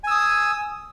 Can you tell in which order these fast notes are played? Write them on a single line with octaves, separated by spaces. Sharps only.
G#5 E6 D#6